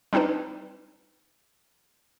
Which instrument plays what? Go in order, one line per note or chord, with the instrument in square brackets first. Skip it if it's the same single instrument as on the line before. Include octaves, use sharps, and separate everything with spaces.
[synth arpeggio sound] G3 C4 D4 D#4 B4